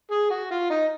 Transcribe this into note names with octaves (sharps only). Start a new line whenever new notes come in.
G#4
F#4
F4
D#4